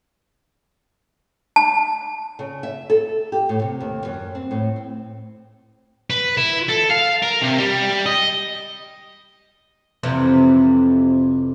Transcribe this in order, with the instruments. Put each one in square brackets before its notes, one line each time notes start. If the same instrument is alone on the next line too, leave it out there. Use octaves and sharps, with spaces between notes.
[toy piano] A5
[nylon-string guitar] C#3
E5
A4
G4
A2
C3
D#2
F#2
C4
A2
C4
[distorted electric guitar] B4
E4
A4
F5
A#4
C3
G3
D#5
[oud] F2 C3 E3